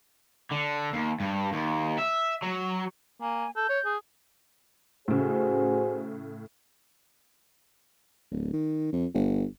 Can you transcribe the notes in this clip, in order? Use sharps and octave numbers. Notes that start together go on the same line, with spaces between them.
D3
D#2
G2
D#2
E5
F#3
A#3 G#5
A4 G6
C#5
G#4
A2 C#3 F#4 G#4 C5
D1
D#3
F2
G1